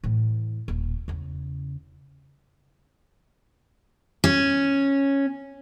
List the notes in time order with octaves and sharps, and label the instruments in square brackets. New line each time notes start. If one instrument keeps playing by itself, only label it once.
[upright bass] A2 E3
D#1
E2 C#3
[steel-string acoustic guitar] C#4